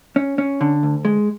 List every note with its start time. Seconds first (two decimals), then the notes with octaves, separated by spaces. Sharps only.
0.16 C#4
0.38 C#4
0.61 D3
0.83 D2
1.05 G#3